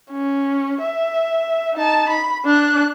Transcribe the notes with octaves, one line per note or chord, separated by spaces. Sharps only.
C#4
E5
D#4 A5
B5
D4 F#6